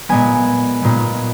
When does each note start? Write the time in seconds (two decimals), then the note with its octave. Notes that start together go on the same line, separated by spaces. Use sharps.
0.09 A#2 G#3 B3 G#5
0.83 A#2 G#3 B3